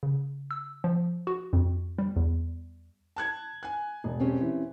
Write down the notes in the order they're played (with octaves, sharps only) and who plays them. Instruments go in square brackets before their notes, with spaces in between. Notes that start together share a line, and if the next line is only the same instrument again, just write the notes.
[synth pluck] C#3
E6
F3
F#4
F2
G3
E2
[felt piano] A5 F#6 G#6
G#5 F#6
E1
[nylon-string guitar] C4 C#4 G4
[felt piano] E3